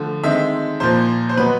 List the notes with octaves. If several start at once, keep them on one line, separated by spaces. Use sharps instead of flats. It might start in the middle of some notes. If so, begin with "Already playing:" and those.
Already playing: D3 F3 A3
D#3 G#3 C4 E5
A#2 F3 A#3 C5
C5
B2 F#3 B3 B4